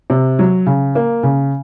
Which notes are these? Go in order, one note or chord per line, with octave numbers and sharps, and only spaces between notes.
C3
F#3
C#3
A#3
C#3